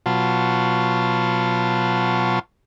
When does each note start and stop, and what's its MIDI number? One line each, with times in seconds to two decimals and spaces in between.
0.06 2.39 47
0.06 2.39 54
0.06 2.39 65
0.06 2.39 81